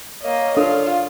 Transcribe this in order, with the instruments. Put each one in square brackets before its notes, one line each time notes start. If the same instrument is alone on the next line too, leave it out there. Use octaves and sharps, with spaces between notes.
[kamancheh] A#3 D#5 [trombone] C#5
[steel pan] D4 [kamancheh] F4 [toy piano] A4 A#4